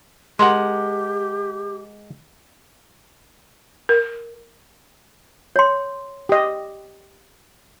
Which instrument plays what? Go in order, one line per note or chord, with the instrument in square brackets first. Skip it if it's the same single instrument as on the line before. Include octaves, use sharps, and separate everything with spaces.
[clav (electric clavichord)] G#3 A#4 F#5 [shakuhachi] G4 [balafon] C6
[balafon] A#4
[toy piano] C#5 C6
[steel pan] G4 D#5